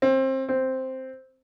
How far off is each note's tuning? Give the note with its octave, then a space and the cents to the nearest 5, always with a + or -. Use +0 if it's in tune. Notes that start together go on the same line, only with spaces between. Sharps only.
C4 +25
C4 +0